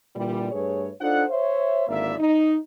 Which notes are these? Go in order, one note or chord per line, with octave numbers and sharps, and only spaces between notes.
A#2 D3 E3 G3
G2 A3 G#4 B4 C#5
D4 D#4 F4 A4 C5 F#5
C5 C#5 E5
G#1 D3 A#3 E4 D5 E5
D#4